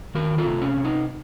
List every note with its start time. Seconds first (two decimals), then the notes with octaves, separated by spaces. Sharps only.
0.15 D#3 F#4 A#4
0.38 F4 A4
0.46 C3
0.62 C#4
0.77 C3
0.85 D#4